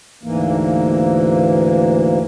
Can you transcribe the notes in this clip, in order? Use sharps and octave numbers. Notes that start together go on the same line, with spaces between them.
D2 G#2 E3 A#3